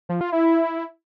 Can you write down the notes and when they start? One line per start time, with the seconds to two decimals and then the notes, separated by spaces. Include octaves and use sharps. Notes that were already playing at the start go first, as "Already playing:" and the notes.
0.09 F3
0.21 F4
0.32 E4